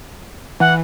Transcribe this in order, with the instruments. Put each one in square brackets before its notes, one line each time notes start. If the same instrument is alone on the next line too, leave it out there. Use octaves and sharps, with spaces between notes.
[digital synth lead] E3 [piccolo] F#5